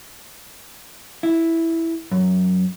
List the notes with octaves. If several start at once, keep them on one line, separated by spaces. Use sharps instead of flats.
E4
F#2